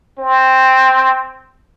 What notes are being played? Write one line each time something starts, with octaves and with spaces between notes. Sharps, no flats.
C4